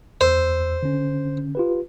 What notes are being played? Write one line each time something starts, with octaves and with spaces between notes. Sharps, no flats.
E2 C5 E6
D3 C#4
F4 G4 B4